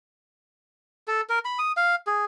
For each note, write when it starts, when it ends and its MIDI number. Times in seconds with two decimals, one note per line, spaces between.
1.08 1.21 69
1.30 1.39 70
1.45 1.59 83
1.59 1.72 87
1.77 1.95 77
2.07 2.25 68